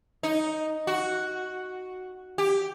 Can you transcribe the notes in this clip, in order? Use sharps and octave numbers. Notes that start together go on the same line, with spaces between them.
D#4
F#4
G4